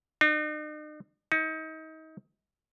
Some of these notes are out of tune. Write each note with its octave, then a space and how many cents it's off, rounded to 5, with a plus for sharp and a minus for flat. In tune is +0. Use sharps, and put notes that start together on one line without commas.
D#4 -45
D#4 +30